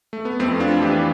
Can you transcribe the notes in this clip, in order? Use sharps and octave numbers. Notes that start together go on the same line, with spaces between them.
A3
B3
F2 A3 C4
D4 F4
E3 G4 B4